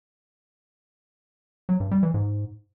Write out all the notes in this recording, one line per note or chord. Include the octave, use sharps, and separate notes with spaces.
F#3
G2
G3
E3
G#2